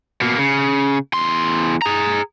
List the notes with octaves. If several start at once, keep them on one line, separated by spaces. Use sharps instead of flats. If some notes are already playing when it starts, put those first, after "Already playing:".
B2 A#3
C#3
E2 C6
G#4 A#5